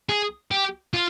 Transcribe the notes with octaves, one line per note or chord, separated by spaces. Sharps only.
G#4
G4
F4